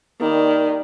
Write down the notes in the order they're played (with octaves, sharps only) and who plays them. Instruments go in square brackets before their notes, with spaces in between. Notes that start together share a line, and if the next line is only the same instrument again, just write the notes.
[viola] D#3 [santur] G3 A#3